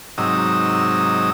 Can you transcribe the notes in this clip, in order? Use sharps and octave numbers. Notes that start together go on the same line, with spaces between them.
G#2 C3 F#3 D#4 D#6 E6